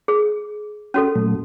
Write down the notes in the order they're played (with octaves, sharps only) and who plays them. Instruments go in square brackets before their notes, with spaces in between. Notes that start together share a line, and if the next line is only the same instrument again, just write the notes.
[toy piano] G#4
C#4 F#4 A4
[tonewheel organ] A#2 F#3 A3